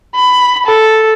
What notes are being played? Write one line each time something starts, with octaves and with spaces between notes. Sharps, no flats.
B5
A4